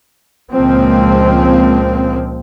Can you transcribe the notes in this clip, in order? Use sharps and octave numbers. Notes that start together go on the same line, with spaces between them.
C#2 A#2 F3 G#3 A#3 C4